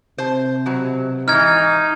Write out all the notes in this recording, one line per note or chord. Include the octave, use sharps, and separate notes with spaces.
C3 C5 A5
B2 F#3
G#2 E3 D#4 F6 G#6